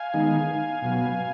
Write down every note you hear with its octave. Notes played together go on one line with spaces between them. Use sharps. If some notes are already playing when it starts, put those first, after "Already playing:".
Already playing: F5 G#5
D#3 G#3 B3 D#4
B2 F#3 B3